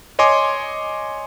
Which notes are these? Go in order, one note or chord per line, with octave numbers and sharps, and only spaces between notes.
C#5 D#5 G#5 C6 D6